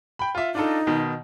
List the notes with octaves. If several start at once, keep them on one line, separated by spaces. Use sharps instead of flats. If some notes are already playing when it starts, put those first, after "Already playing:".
G5 B5
F4 E5
D4 D#4 F4 A4
B2 D#3